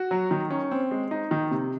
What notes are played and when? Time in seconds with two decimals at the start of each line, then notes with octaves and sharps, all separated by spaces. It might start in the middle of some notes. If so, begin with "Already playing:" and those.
Already playing: F#4
0.11 F#3
0.31 D#3
0.50 C#4
0.71 C4
0.91 G#3
1.11 D#4
1.31 D#3
1.51 C3